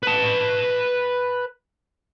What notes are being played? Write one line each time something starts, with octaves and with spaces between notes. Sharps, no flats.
B4 A5